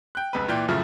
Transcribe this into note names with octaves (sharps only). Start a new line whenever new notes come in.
G5 F#6
F1 C#2 B4
A#2 E3 D5 G5
F#2 A2 C#3 F3 E4